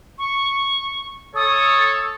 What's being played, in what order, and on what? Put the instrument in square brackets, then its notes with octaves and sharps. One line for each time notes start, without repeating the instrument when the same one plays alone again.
[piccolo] C#6
[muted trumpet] A4 [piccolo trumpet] C#5 [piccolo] D#6